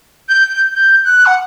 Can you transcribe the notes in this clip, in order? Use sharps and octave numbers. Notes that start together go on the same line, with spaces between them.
G6
G6
F#6
F#5